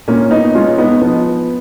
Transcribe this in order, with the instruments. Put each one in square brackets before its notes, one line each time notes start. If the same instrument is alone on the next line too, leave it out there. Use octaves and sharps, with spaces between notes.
[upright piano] A#2 A#3 C#4
B3 D#4
G#3 C#4 F4
B3 D#4
F3 B3